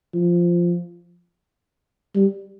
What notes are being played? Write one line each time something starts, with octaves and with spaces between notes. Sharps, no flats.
F3
G3